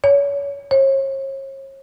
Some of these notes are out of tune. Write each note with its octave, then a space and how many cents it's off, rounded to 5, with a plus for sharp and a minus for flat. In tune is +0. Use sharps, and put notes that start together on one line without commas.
C#5 +30
C#5 -40